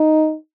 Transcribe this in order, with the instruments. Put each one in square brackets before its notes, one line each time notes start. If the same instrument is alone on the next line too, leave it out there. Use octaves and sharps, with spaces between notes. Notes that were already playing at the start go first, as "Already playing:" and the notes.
Already playing: [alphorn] D#4